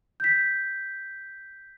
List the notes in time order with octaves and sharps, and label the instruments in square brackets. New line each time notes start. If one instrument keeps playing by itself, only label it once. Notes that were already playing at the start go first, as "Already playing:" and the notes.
[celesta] G6 B6